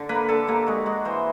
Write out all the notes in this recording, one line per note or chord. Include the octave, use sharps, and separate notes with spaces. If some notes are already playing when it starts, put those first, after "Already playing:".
Already playing: D3
A#3 B4
D3 A4
A#3 G4
G#3 F#4
G#3 F#4
E3 C5